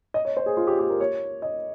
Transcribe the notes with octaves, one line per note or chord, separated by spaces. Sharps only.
D#5
C#5
C5
G#4
F4
G4
G4
A#4
C#5
D#5